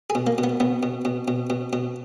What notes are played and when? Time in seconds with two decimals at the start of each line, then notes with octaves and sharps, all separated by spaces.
0.10 G#4
0.15 B2
0.27 A#3
0.38 B2
0.44 B3
0.60 B2 B3
0.83 B2
1.05 B2
1.28 B2
1.50 B2
1.73 B2